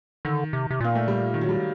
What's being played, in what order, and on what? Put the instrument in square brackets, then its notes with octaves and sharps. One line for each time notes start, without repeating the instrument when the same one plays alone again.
[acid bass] D3 [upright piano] D#3
[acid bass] C3
C3
[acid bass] A#2 [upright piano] A#3
[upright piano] A3
G3
D#3
F#3
G3